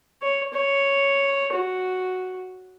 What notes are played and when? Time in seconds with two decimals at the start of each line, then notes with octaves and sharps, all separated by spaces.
0.22 C#5
0.53 C#5
1.53 F#4